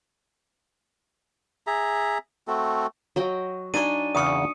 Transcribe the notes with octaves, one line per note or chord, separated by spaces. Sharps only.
G#4 E5 A#5
A3 C4 F#4 A4
F#3 D#5 G5
D4 D#4 G#5 C#6 D#7
E2 C#3 E3 D#6 C#7